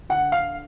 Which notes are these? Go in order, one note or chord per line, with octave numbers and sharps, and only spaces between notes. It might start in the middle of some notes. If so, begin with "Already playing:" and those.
D3 F#5
F5